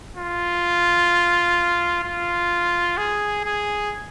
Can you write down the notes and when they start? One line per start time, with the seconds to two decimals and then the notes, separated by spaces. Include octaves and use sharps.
0.17 F4
2.04 F4
2.97 G#4
3.44 G#4